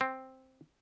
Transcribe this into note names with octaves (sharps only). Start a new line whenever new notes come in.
C4